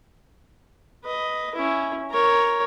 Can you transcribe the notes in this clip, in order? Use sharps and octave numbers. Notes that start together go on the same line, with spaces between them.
B4 D#5
C#4 E4
A#4 C#5